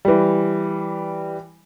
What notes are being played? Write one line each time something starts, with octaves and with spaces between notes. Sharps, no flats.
E3 G3